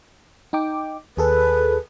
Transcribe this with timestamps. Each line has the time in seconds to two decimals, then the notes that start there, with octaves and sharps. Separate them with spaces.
0.53 D#4 G5 D6
1.17 D#2 G#4 A4 B4